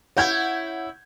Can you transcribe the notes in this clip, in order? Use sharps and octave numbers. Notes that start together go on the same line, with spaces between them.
E4 C#5 F#5 G6 G#6